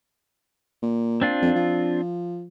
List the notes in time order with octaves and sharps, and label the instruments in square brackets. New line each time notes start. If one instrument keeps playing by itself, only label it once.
[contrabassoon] A#2
[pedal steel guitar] C4 D4 F4
[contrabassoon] F2
F3